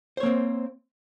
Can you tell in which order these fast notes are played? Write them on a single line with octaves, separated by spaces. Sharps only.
C5 C#5 A#3 C4